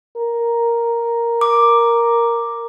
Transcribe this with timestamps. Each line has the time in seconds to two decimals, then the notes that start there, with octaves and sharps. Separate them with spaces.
0.16 A#4
1.41 D6